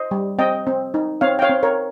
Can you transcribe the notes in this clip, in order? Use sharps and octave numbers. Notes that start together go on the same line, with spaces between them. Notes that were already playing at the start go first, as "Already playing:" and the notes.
Already playing: C5 D#5
G3
C4 D#5 G5
C4
D#4
C4 C#5 F5
G5
C#5 F5
C4
A#4 C#5